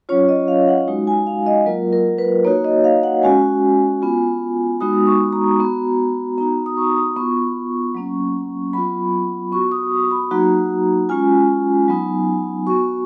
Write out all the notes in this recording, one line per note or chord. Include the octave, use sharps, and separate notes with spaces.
F#3 C#4 F4 C#5
D#5
F5
F#5
G#3 D#4 F#4
G#5
F5
D#5
F#3 A#3 F4 A#4
A#4
B4
A#3 D#4 F#4 C#5
D#5
F5
F#5
G#3 C#4 F#4 G#5
B3 F4
G#3 B3 D#4 F#4 D#6
C#6
A#5
B3 F#4
B3 D#4 F#4 A#5
D#6
C#6
D#6
B3 F4 C#6
F#3 A#3 C#4
F#3 B3 F4 B5
B3 F#4 C#6
D#6
B5
F#3 A#3 D#4 F#4 A#5
G#3 C#4 F4 G#5
F#3 B3 D#4
B3 F#4 C#6